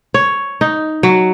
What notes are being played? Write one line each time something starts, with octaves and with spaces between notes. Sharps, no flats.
C#5
D#4
F#3